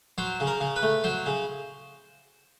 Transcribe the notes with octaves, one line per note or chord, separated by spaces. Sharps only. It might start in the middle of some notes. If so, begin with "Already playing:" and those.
F#3 C5
C#3
A#4
C#3
B4
A3
F#3 C5
C#3